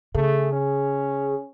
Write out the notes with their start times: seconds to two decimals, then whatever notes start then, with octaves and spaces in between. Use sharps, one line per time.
0.15 C#3 A3 G#4
0.52 C#4